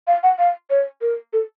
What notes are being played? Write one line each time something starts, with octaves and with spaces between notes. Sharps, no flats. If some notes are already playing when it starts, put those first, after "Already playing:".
F5
F#5
F5
C#5
A#4
A4